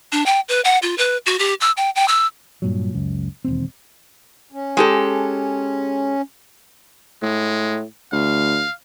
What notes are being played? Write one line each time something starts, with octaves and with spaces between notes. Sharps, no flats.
D4
G5
B4
F#5
F4
B4
F#4
G4
E6
G5
G5
E6
G2 A#2 F#3
C#2 F#2
E1 D#2 C4
C#4
G#3 G4 A4
A2 G#3
D2 F5